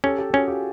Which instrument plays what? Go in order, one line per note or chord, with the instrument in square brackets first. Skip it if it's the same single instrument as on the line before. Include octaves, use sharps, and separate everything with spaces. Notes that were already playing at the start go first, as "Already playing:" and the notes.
[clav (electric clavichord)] C#4 [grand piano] G4 A4
[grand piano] G4 A4
[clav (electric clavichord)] C#4 [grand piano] F#4 G#4
[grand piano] F4 G4